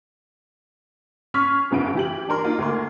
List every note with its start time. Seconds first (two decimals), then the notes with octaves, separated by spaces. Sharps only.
1.34 C#4 C6 C#6 F6 B6
1.71 F#1 B1 C#3 B3 D7
1.95 E3 G4 F#7
2.29 D4 A#4 C6
2.44 A#3 D#4 F4
2.59 D2 A#3 C6